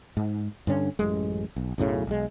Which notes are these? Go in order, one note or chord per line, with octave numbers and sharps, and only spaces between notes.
G#2
G2 D3 C#4
A1 F#2 G#3
B1
B1 F#2 A2 C#3
B1 G#3